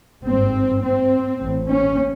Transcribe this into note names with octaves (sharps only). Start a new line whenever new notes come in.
G#1 G2 C4
C4
A1 A2
C#4